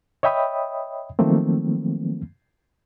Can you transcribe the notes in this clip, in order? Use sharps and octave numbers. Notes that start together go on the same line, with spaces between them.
C#5 D#5 E5 G5 B5 D#6
D#3 F3 F#3 A3 A#3 C4